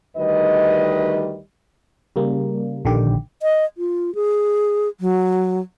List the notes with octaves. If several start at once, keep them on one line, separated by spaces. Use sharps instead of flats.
D2 D#3 G3 B4 D#5
C#3 G3 A#3
A#1 D3 D#3 G4
D#5
F4
G#4
F#3